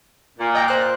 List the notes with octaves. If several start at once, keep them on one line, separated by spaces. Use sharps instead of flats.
A#2
D#5 G5 A#5
C5 F#6